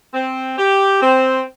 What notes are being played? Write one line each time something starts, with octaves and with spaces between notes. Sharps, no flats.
C4
G4
C4